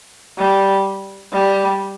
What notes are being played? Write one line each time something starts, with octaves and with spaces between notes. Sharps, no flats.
G3
G3